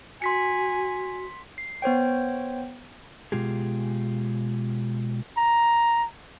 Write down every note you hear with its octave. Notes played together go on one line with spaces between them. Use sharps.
F#4 G#5 C6 B6 C#7
C7
B3 C5 C#5 G5
B2 G#3 F4 G4 G#4
A#5